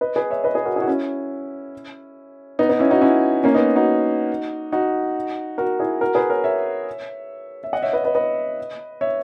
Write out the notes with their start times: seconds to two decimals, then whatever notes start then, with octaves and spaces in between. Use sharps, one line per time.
0.01 B4 D#5
0.16 G#4 B4
0.30 C#5 E5
0.44 B4 D#5
0.55 G#4 B4
0.65 F#4 A#4
0.76 E4 G#4
0.82 F#4
0.87 C#4 E4
2.59 B3 D#4
2.69 B3 D#4
2.79 C#4 E4
2.90 D#4 F#4
3.01 C#4 E4
3.44 A#3 C#4
3.54 B3 D#4
3.76 D#4 F#4
4.72 D#4 F#4
5.58 F#4 A#4
5.79 E4 G#4
6.01 F#4 A#4
6.15 G#4 B4
6.30 A#4 C#5
6.44 C#5 E5
7.64 E5
7.73 D#5 F#5
7.82 C#5 E5
7.93 B4 D#5
8.04 B4 D#5
8.15 B4 D#5
9.01 C#5 E5